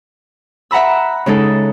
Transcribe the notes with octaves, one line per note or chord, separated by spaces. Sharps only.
E5 F#5 A#5 B5 E6
C#3 G#3 D#4 A4